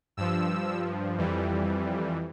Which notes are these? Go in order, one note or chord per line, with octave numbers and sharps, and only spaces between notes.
G2 F3 E6
F2 E3 G3